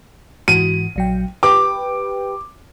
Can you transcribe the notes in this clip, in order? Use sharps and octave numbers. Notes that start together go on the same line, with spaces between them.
G#2 E3 F#4 D#7
A#1 F#3 G5
G4 B4 G5 D6